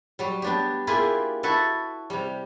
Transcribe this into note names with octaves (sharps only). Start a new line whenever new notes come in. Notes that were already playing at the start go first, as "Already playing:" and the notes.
F#3 G3
B3 D4 G4
A#3 E4 F4 G4 G#4 B4
E4 F#4 A4 B4
C3 G3